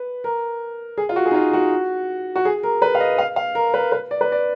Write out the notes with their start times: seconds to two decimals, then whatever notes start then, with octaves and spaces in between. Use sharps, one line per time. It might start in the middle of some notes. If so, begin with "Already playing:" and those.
Already playing: B4
0.24 A#4
0.98 G#4
1.09 F4
1.16 F#4
1.26 G#4
1.31 D#4
1.34 F4
1.53 F#4
2.36 F#4
2.45 G#4
2.63 A#4
2.82 B4
2.95 F5
3.00 D#5
3.19 F5
3.36 F5
3.55 A#4
3.74 B4
3.92 B4
4.11 D5
4.21 B4
4.32 D5